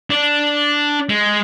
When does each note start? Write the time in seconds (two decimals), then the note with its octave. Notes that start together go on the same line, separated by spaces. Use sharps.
0.10 D4
1.09 G#3